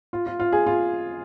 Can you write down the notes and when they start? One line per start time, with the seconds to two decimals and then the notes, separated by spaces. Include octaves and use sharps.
0.13 F4
0.26 F4
0.40 F4
0.52 G#4
0.67 F4